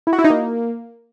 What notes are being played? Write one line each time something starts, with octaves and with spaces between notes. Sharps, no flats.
E4
F#4
E4
D#4
A#3